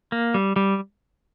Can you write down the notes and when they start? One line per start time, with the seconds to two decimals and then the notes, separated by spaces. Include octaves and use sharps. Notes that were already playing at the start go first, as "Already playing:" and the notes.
0.12 A#3
0.34 G3
0.56 G3